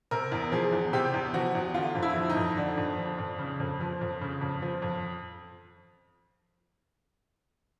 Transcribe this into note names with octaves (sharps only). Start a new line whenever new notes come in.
C3 A#4
E2
F3 G#4
E2
C3 G4
E2
F3 F#4
E2
D3 F4
F2
E4
F3
D#4
F2
D3 D4
F2
F3
F2
C#3
F2
F3
F2
C#3
F2
F3
F2